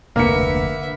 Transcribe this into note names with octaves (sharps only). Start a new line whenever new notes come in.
F1 D2 D3 A#3 B4 E5 C#7